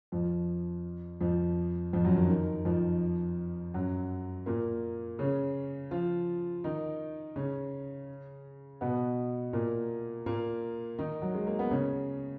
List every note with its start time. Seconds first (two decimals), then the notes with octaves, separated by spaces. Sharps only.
0.12 F2 F3
1.21 F2 F3
1.93 F2 F3
2.05 F#2 F#3
2.17 D#3
2.29 D#3
2.65 F2 F3
3.74 F#2 F#3
4.46 A#2 A#3
5.19 C#3 C#4
5.91 F3 F4
6.64 D#3 D#4
7.36 C#3 C#4
8.81 B2 B3
9.53 A#2 A#3
10.26 A#2 A#3
10.99 D#3 D#4
11.22 F#3
11.34 G#3
11.47 A#3
11.59 B3
11.71 C#3 C#4